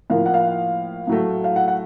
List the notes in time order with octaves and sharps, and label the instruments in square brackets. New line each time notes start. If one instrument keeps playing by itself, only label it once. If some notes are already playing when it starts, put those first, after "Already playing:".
[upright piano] A2 F3 A#3 F5
F#5
F5
A2 F#3 A3
F5
F#5
F#5